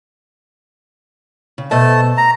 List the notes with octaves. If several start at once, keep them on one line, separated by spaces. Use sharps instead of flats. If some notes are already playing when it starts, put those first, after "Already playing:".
C#3
B2 A3 C5 D#5 A5
A#5